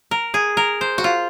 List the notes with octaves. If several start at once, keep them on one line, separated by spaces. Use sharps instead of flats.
A#4
G#4
A#4
C5
F#4
F4